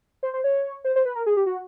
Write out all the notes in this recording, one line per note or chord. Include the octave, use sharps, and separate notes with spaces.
C5
C5
C#5
C5
C5
B4
A#4
G#4
G4
F#4